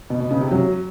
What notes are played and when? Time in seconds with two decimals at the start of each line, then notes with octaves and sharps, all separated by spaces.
0.10 B2
0.20 B2
0.31 C#3
0.41 C3
0.51 F#3